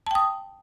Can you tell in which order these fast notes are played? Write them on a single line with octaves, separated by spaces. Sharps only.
A5 G5 D#6